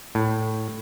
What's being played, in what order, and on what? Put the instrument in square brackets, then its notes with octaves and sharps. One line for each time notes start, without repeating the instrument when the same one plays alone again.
[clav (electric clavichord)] A2